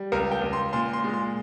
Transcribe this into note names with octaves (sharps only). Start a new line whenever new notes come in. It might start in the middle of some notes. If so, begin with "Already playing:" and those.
Already playing: G3
C#2 A#4
G5
C#2
C6
A#2 C6
C6
G#3
C6